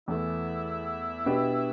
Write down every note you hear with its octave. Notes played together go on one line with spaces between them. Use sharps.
E2 E3 A3 E4
B2 B3 D4 G4 B4